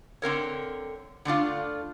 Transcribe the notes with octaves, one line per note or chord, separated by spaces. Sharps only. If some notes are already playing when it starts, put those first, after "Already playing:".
D3 C4 A#4 C#5
D3 A3 D4 F4